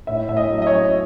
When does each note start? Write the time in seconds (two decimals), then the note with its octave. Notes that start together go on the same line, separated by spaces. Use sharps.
0.07 A2 E5
0.29 A2 E5
0.37 D#5
0.52 F#3
0.62 D#5
0.67 C#5
0.74 C#4